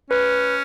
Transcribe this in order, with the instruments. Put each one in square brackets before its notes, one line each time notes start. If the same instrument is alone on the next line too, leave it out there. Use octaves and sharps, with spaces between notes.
[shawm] C#4 [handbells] B4